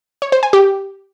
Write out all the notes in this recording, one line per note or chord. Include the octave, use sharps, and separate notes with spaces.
C#5
C5
G#5
G4